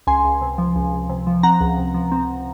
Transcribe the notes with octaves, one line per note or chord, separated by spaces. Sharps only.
C#2 G#5 C6
C#2
C3
F3
C#2
C#2
C3
F3
C4 F#5 A#5
C#2
C3
F3
C4